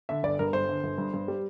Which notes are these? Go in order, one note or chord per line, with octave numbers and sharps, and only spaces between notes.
D3 E5
G1 D5
G2 A#4
G1 C5
D3
G1
G2
G2
G3